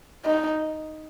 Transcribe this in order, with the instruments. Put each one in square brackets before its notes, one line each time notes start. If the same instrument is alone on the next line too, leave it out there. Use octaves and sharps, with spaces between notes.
[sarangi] D#4